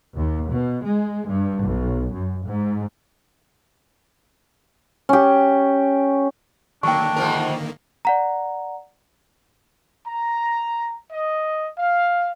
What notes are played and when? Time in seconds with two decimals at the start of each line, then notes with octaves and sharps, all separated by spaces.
0.16 D#2
0.48 B2
0.85 G#3
1.28 G2
1.64 B1
2.13 F#2
2.45 G#2
5.09 C#4 G4
6.83 D3 D#3 F#3 A#3 D4 G5 C#6
7.16 G#2 F3 A#4
8.05 D5 F#5 A#5
10.07 A#5
11.11 D#5
11.76 F5